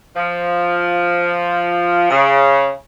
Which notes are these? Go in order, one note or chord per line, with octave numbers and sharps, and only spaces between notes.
F3
C#3